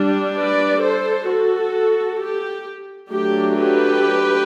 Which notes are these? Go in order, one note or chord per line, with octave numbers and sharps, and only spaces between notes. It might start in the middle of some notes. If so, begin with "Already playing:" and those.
Already playing: G3 D4
B4 D5
A4 C5
F#4 A4
G4
F#3 A3 D4 G4
G4 B4